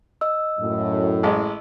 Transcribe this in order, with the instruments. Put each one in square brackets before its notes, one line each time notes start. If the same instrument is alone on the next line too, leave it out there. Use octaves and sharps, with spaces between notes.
[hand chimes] D#5 E6
[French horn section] F#2 A2
[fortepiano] A1 G#3